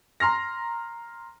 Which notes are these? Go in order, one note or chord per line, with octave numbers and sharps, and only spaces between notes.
A#5 C6 F6 A#6